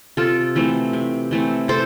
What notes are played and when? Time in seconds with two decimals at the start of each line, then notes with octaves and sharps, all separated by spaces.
0.17 C3 F4 A4
0.55 E3 A3 C4
0.93 C3
1.31 E3 A3 C4
1.68 C3 A4 C5